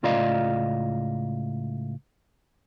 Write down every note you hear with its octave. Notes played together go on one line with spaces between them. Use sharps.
C#2 A2 F4 D5 D#5 F5